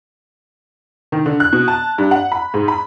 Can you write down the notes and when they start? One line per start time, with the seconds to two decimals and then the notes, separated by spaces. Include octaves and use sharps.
1.12 D#3
1.26 D3
1.40 F#6
1.53 B2
1.68 A5
1.98 G2
2.11 F#5
2.32 B5
2.54 G#2
2.68 B5